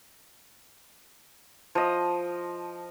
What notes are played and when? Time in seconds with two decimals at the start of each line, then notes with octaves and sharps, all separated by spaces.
1.75 F3 D#5